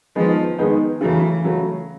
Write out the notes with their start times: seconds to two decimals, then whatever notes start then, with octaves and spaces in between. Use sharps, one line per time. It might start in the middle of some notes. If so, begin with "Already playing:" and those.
0.16 D#3 F3 G#3 B3 D#4
0.58 D#3 G#3 B3 D#4
1.01 C#3 E3 F#3 A3
1.44 C#3 F#3 A3